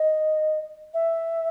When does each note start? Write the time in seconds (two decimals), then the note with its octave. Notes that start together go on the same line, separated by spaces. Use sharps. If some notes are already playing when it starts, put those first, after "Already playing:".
Already playing: D#5
0.94 E5